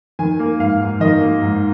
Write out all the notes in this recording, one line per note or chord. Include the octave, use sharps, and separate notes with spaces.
D#3 G#5
A#3
G#2 F5
G#2
D#3 D#5
A#3
G#2